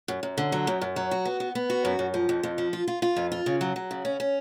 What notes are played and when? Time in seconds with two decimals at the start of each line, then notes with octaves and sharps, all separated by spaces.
0.08 F#2
0.23 F#2
0.38 D3
0.52 F#3
0.67 F#2
0.81 F#2
0.96 F#3
1.11 F#4
1.25 B3
1.40 B3
1.55 B3
1.70 F#4
1.85 F#2
1.99 F#2
2.14 F3
2.29 F2
2.43 F2
2.58 F3
2.73 F4
2.88 F4
3.02 F4
3.16 F2
3.32 F4
3.46 C#3
3.61 F#3
3.76 F#3
3.91 C#3
4.05 C#4
4.20 C#4